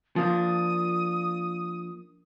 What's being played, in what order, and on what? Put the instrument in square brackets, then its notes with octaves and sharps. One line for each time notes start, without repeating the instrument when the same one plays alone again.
[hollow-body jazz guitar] F3 A#3 D4 [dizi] D#6